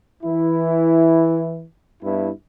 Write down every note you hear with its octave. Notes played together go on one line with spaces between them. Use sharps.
E3 E4
G2 B3 E4